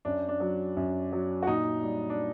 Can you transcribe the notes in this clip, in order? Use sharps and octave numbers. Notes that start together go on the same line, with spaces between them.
F#2 D4
D4
F#3
F#2
F#3
F#4
A#2 D#4
G3
D4